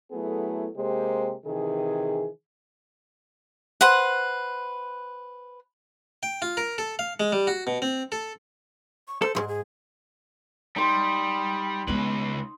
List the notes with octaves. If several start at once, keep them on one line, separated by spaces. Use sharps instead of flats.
F#3 A3 B3 E4 G#4 A4
C3 G#3 A#3 G4 C5
C3 D#3 E3 G#4
B4 C5 F#5
G5
F4
A#4
A4
F5
G#3
G3
F#4
B2
C4
A4
C#6
A4 C5
D2 G#2 G#4
G#4
G3 D#4 C6
C#2 G#3 B3 B4